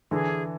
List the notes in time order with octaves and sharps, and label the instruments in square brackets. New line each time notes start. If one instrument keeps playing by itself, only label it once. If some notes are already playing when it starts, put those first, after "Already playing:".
[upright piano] D3 E3 [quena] G#4